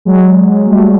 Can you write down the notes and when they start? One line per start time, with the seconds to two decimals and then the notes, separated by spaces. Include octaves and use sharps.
0.05 F#3 G#3
0.66 G3 A3